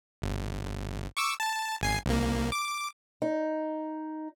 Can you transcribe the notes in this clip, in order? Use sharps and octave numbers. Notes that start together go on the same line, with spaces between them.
G1
C#6 D6 E6
A5
G#1 G#5 C7
C2 A#3
D6
D#4